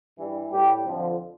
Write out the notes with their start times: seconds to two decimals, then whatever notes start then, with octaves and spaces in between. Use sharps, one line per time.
0.18 G2 E3 G3
0.51 A2 G3 G4
0.84 F2 D3 F3